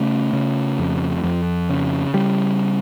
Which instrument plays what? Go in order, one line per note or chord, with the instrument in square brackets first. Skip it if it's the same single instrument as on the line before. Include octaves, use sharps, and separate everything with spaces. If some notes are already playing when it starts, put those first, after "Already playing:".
Already playing: [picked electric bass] C#3 A3
C#3
F2
F2
C#3
C#3 G3